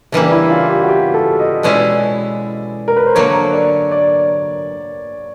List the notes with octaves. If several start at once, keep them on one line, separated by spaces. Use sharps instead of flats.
C#3 E3 G3 A#3 D4
E4
F4
G4
F#4
G4
A4
D#5
B2 G#3 C#4 E4 D5
A#4
B4
C5
D3 F#3 A#3 C#5
D5
D5